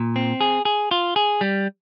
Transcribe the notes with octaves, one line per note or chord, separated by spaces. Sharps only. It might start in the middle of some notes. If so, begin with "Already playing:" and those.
Already playing: A#2
C4
G#4
G#4
F4
G#4
G3